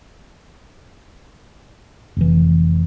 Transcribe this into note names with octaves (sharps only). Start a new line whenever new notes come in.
F1 E3